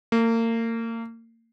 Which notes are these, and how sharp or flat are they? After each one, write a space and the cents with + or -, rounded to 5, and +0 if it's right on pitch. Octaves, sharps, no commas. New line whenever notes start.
A#3 -35